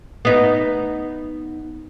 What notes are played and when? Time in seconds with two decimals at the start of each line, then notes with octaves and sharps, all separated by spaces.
0.25 B3 D#4